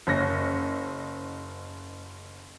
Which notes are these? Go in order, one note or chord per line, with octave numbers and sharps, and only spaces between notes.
F#1 C#4 A#6 C#7